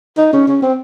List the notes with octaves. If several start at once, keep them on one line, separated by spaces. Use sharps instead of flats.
D#4
C#4
C#4
C4